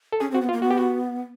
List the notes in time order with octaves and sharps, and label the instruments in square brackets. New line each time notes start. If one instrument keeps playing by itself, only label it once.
[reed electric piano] A4
[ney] C#4 [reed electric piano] G#4
[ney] C4
[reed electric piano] F#4
[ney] B3
[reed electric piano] F4
[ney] A#3
[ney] B3 [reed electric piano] F#4
[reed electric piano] G4
F#4